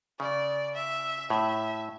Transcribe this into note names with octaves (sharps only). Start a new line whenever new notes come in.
C#3 D5
E5
A2 E5